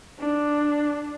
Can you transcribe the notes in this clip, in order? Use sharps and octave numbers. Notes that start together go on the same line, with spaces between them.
D4